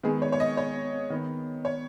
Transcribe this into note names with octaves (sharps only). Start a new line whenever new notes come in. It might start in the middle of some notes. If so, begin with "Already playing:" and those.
D#3 G#3 B3 G#4
C#5
C#5
D#5
C#5
D#3 B3
C#5